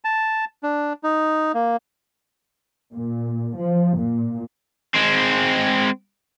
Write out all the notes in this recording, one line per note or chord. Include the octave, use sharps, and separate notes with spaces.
A5
D4
D#4
A#3
A#2
F3
A#2
G#3 C4